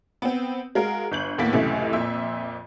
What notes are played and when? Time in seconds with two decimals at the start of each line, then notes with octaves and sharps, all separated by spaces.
0.22 B3 C4
0.75 G#3 F#4 A#4 F5
1.12 G1 G6 F#7
1.38 D#2 A2 A#3 B3 B6
1.53 C#2 F#2 A2 C3 E3 A3
1.93 F2 A#2 E5